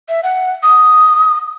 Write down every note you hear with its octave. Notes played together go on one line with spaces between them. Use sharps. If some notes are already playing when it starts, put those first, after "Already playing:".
E5
F#5
D#6